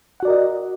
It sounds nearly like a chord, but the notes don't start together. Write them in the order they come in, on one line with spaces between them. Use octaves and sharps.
F#5 F#4 D5 A#4 D#5